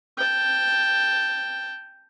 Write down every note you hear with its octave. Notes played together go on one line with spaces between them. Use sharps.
G5 A5